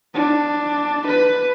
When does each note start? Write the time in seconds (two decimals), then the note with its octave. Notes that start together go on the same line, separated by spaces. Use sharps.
0.14 D4
1.06 B4